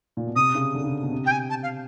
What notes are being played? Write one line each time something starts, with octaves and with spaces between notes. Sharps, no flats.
A#2
B2
C3 D#6
C#3
D3
C#3
B2
C3
G5
G#5
A5
F5